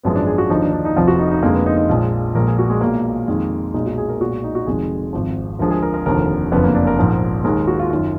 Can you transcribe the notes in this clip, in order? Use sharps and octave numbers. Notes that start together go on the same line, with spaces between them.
G#1 F#2 F3 G#3 B3
D4
G#4
F#4
D#2 D3 F3 D#4
D4
D4
D#4
F1 F2 F3 F4
F#4
D#4
D#4
F1 F2 D3 G#3 A#3
B3
D#4
D#4
A#1 A#2 F3 G#3 F4
A#1 A#2 G#3 A#4
G#4
F#4
G#3
B1 A#2 G#3 A#3
F2 D#3 G#3
B1 A#2 G#3 D#4
F#4
G#4
A#4
B1 A#2 G#3 F#4
D#4
F#4
F1 F2 D#3 G#3 G#4
G#1 G#2 F3
D2 D3 F3 G#3 A#4
G#4
A#4
A#4
F1 D#2 D3 F3 A#4
F#1 F2 D3 F3 B3
A#3
D4
A#4
A#1 G#2 F3
D#2 D#3 G#3 A#4
F#4
F4
F#2 D#3 F4